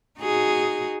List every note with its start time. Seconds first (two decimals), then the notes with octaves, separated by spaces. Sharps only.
0.19 D#4 F#4 G#4